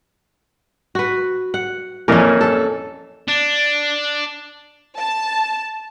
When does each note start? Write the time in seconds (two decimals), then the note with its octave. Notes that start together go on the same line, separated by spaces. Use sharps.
0.95 F#4 B4
1.54 F#5
2.08 F2 A#2 E3 C#4 A#4
2.41 A4
3.28 D4
4.97 A5